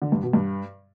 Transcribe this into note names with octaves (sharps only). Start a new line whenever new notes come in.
D3
G2
B2
G2